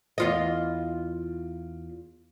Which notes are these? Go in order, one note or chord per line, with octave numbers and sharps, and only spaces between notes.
E2 F4 D#5